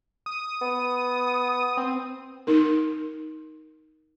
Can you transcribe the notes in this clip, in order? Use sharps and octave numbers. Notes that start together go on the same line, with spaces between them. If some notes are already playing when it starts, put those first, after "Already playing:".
D#6
B3
C4
D#4 A#4